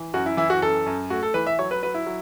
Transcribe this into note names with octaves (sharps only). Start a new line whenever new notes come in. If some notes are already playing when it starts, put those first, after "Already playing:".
Already playing: E3
F#2 F#4
E4
E3 E4
F#4
F#2 A4
F#2
A3 F#4
A4
E3 B4
E5
F#3 C#5
B4
F#3 B4
E4
F#3